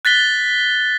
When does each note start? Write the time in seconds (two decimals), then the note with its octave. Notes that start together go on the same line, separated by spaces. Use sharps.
0.05 F#6 A6 B6 G7